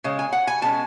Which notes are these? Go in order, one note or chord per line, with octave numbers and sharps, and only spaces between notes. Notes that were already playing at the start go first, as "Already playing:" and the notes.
C#3 G#3
G#5
F#5
G#5
B2 G#3 C#4 A5